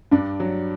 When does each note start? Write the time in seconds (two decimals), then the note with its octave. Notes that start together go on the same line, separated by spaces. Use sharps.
0.11 G2 D4
0.40 F#3